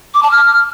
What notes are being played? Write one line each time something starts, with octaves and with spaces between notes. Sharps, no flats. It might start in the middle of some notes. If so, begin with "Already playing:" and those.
D6
A5
F6